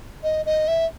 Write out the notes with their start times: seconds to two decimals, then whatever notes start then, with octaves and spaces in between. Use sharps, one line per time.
0.23 D#5
0.46 D#5
0.68 E5